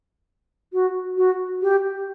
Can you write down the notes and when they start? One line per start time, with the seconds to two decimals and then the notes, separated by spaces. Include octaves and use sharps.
0.73 F#4
1.17 F#4
1.62 G4